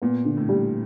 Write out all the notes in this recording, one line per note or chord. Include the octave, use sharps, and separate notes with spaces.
A#2 B3
D3
A2
G3